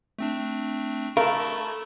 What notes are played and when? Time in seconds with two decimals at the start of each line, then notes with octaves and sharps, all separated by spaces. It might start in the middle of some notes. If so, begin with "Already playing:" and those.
0.19 A3 C4 D4
1.17 A3 A#4 F5 A5 B5 C#6